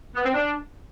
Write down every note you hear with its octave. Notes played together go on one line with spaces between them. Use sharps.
B3
C4
D4